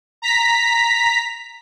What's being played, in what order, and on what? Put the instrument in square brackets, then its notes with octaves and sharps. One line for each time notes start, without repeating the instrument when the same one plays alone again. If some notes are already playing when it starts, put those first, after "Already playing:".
[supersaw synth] A#5 B6